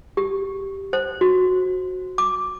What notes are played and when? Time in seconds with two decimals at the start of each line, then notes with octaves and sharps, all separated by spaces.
0.17 G4
0.93 C5
1.21 F#4
2.18 D6